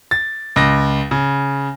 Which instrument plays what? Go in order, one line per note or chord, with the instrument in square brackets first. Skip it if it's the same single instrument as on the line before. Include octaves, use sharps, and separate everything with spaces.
[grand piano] A6
C#2 A#6
C#3